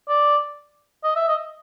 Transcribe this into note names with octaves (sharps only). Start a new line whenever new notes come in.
D5
D#5
E5
D#5